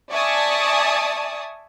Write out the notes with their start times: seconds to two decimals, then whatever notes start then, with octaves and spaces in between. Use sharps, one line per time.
0.12 D5 E5 G#5 A5 C#6 D#6